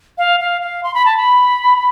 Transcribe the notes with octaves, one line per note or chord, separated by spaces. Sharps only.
F5
F5
F5
C6
B5
A5
B5